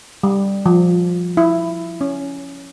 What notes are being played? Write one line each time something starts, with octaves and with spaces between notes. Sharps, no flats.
G3
F3
E4
C#4